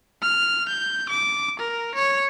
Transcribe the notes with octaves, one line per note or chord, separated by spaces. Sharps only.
F6
G6
D6
A#4
C#5